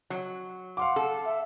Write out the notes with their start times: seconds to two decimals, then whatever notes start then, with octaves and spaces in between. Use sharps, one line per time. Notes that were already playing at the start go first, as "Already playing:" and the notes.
0.10 F#3
0.77 F5 F#5 C6 D6
0.96 A4
1.25 E5